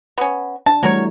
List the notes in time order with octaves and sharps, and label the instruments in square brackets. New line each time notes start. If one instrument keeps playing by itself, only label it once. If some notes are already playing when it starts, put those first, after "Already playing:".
[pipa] B3 C#4
[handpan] D4 [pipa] A5
[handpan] E3 G3 A3 [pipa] F#3 A#4 C#5